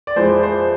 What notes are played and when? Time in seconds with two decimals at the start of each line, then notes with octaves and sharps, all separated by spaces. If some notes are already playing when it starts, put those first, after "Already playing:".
0.07 D5
0.16 F2 E3 G#3 C5
0.43 C5